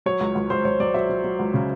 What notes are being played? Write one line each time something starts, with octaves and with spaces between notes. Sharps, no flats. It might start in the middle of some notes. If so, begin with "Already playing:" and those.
F#3 C#5
C#2
C#2
C#2 C5
C#2 C#5
F#3 D5
F#3 E5
F#3
F#3
C#2
C#3